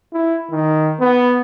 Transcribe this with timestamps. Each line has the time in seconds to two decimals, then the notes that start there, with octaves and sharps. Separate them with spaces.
0.13 E4
0.51 D#3
1.00 B3